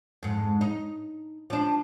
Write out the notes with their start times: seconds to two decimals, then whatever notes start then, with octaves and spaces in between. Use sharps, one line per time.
0.23 F2 G#2
0.61 D#4
1.50 F3 D4